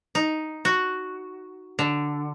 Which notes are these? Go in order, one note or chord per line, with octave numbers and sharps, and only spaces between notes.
D#4
F#4
D3